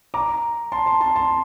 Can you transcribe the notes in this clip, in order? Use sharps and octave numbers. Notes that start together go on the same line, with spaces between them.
A#5 D6
A5 C6
A5 C6
A5 C6
A5 C6